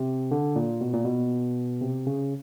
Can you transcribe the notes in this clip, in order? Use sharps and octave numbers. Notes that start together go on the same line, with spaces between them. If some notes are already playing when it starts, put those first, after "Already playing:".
Already playing: C3
D3
A#2
B2
A#2
B2
C3
C#3